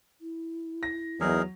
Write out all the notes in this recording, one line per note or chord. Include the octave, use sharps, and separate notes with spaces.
E4
A#6
E2 F#3 D#4 G#4 A#4